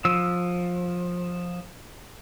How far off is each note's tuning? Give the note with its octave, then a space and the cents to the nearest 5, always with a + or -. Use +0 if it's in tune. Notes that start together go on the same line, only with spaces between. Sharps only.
F3 +20 E6 +0